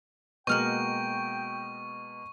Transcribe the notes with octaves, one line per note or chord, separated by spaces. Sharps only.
B2 G#3 A#3 F#4 G5 C#6 F6 G6